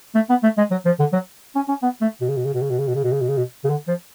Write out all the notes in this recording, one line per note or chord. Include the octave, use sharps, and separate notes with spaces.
A3
B3
A3
G#3
F#3
F3
D3
F#3
C#4
C#4
B3
A3
B2
C#3
B2
C#3
B2
C#3
B2
C#3
B2
C#3
B2
C#3
B2
C#3
B2
C#3
D3
F3